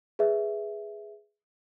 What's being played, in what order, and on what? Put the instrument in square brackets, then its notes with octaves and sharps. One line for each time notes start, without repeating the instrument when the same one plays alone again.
[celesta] G#4 B4 E5